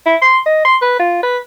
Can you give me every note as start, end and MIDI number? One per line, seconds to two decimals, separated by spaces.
0.06 0.16 64
0.22 0.38 84
0.46 0.62 75
0.65 0.76 84
0.82 0.99 71
0.99 1.20 65
1.23 1.38 71